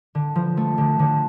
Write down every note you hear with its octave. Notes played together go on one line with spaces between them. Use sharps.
D3
F3
A3
D3
D3